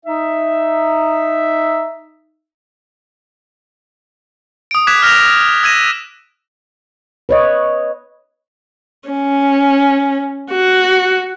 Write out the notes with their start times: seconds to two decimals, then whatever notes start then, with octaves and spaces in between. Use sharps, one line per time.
0.05 D#4 E5
4.71 D#6 D7
4.87 D6 F#6 G#6 B6 E7
5.02 F6 A#6 E7 F7
5.63 E6 G#6 A#6 D#7 E7
7.29 B4 C#5 D#5
9.09 C#4
10.51 F#4